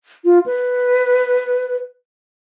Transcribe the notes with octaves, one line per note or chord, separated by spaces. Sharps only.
F4
B4